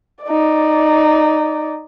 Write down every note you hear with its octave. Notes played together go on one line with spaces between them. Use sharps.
D#4 D5